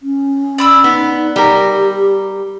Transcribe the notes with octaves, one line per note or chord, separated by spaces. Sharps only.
C#4
D5 B5 E6
B3 D#4
G3 G4 A#4